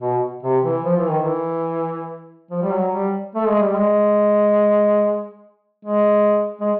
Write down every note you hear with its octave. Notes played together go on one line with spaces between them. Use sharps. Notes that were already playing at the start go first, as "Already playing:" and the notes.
B2
C3
E3
F3
E3
D#3
E3
F3
G3
F#3
G3
A3
G#3
G3
G#3
G#3
G#3